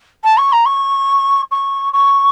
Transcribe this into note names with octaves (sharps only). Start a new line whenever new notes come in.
A5
C#6
A#5
C#6
C#6
C#6